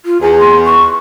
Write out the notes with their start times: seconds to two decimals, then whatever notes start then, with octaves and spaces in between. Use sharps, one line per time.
0.06 F4
0.22 E2 G#5
0.39 C6
0.66 C#6